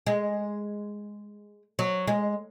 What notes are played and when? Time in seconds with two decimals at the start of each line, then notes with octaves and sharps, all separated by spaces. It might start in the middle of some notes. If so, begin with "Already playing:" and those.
0.07 G#3
1.79 F#3
2.07 G#3